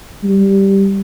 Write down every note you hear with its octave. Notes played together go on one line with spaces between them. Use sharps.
G3